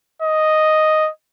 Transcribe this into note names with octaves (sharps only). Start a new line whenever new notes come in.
D#5